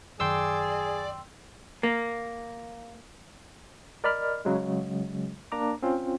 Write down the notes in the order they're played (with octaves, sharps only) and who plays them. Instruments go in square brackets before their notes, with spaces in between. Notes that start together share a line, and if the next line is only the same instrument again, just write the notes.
[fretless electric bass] F#2 D#3 [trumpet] G#4 [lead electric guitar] D5 [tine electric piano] G5 C6 E6
[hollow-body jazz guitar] A#3
[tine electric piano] A#4 D5 D#5 B5 F6
C#3 F#3 G#3
A#3 D4 A#5 D6
C4 C#4 F4